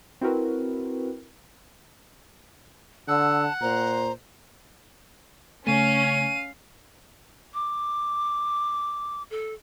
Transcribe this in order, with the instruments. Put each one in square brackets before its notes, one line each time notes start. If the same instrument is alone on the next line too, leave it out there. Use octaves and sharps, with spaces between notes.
[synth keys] C4 E4 F#4 A#4 B4
[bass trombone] D3 [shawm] F#5 [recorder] A5 [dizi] E6
[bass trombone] A#2 [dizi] C5 [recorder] A#5
[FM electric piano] C#3 A3 [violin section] C#4 [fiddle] F5 [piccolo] D#7
[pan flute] D6
A4